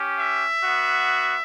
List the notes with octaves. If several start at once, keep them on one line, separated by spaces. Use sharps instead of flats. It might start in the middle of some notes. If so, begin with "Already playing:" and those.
Already playing: C#4 G4
E5
B3 F#4